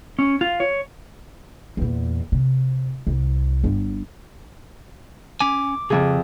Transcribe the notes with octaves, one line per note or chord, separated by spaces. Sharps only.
C#4
F4
C#5
E2 A#2
C3
C2
G1
C#4 G#5 D6
C2 F2 C#3 G#4